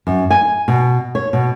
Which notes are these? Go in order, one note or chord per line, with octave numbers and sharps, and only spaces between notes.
F#2
G#5
B2
C#5
B2